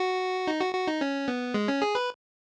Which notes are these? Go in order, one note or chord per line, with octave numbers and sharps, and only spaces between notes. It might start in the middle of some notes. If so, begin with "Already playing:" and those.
Already playing: F#4
D#4
F#4
F#4
D#4
C#4
B3
G#3
C#4
G#4
B4